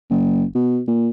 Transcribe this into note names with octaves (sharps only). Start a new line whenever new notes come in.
F#1
B2
A#2